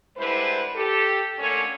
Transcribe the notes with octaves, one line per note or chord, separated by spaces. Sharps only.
D3 G3 G#3 E4 B4 C5
G4 A4
A#2 D3 A3 C#4 A4 C#5